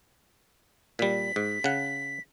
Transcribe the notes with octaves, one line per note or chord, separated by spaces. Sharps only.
A#2 G3 B6
G#2
C#3 F#5